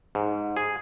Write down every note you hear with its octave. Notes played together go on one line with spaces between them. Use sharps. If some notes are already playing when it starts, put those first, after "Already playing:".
G#2
G#4